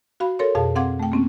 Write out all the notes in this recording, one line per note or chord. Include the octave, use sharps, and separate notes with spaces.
F#4 F5 B5
A4 A#4 C#5 C6
F2 B2 G#4 F5 A5
C4 F5 F#5 C6 D6 G#6
A3 G5
A#3 C4 C#4